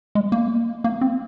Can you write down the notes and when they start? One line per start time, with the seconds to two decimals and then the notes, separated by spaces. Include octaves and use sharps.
0.15 G#3
0.32 A#3
0.84 A#3
1.01 C4